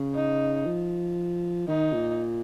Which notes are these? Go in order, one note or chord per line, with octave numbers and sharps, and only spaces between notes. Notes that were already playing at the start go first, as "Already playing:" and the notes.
Already playing: C#3
D#4
F3
D#3 D#4
A#2